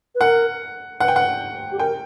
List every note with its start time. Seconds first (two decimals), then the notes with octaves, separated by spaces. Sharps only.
0.15 B4
0.21 A#4 F#5
1.00 B4 F#5
1.08 G5
1.16 F#5
1.72 G4
1.79 A#4 G5